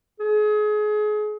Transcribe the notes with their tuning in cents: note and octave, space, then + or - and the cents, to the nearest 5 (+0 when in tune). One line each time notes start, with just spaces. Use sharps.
G#4 +30